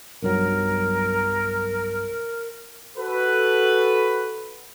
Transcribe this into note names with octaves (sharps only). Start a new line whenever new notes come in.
B1 G2 F#3 A#4
F#4 A4 B4